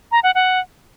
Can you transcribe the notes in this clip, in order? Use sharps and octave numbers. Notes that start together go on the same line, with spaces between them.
A#5
F#5
F#5